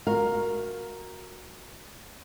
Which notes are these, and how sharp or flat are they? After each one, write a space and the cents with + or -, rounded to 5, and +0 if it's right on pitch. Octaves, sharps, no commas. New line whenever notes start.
F#4 -10 A#4 +0 F5 +15